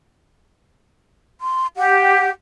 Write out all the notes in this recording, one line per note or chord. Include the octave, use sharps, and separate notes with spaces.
C6
G4 F#5